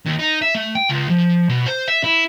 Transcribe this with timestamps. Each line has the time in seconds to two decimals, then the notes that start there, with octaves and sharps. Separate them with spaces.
0.06 D#2
0.19 D#4
0.42 E5
0.55 A3
0.75 G5
0.89 C#2
1.09 F3
1.49 B2
1.66 C5
1.88 E5
2.04 E4